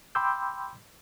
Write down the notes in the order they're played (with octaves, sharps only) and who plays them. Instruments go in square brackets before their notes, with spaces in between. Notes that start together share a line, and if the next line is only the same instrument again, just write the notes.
[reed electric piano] G5 B5 C6 D6 E6 G6